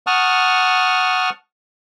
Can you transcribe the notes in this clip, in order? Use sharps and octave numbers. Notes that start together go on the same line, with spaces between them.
F#5 A5 C#6 D#6 F6